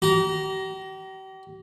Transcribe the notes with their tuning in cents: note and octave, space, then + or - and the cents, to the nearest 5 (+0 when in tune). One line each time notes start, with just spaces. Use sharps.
G4 -40 A#5 +10